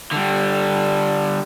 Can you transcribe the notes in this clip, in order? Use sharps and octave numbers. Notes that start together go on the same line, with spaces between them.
D3 G3